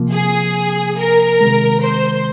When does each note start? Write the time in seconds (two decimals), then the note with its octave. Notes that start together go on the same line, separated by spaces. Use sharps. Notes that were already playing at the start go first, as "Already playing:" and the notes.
Already playing: C3 F3 A#3
0.13 G#4
0.99 A#4
1.41 C3 D#3 G#3
1.83 C5